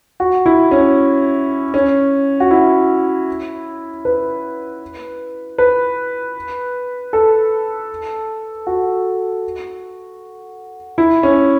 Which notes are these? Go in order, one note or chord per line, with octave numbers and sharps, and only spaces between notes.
F#4
E4
C#4
C#4
F#4
E4
B4
B4
A4
F#4
E4
C#4